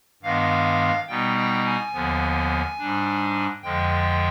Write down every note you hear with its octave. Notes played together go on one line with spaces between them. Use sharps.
G2 D#3 G#3 B3 F5
B2 G3 B3 D#4 G5
G5
G#5
D#2 D3 F3 B3
G#2 G3 D4
F2 D3 F3 G#3 G5